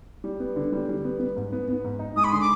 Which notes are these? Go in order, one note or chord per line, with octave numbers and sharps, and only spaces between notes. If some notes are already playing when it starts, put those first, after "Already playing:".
G3
B3
D3
G3
G3
B3
B3
G#2
B3
B3
G#2
D#4
G#3 D#6
B5
D3 C6
D6